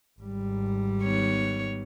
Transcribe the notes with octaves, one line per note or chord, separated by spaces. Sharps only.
G#1 G3
D#3 B3 C#5